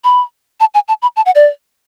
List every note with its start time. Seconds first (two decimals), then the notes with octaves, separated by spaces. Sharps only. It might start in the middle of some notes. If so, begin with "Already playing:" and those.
0.04 B5
0.60 A5
0.74 G#5
0.88 A5
1.02 B5
1.16 A5
1.26 F#5
1.35 D5